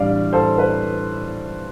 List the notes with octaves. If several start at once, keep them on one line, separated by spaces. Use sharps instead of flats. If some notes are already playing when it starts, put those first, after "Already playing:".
Already playing: A2 E3 G3 D4 D5 F5
A4 C5
B4